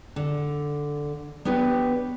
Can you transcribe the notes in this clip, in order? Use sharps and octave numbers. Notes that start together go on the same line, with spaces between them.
D3
B3 D4 G4 B4 C#5